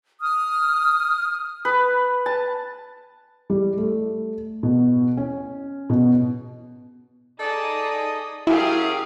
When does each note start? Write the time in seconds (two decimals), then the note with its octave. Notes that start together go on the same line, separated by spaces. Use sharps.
0.21 D#6 F6
1.65 B4
2.26 A5
3.50 G3
3.77 A3
4.63 B2
5.17 C#4
5.90 B2
7.40 D#4 G#4 A4 D5 D#5 D#6
8.47 F#2 F#3 E4 G4 G#4 F5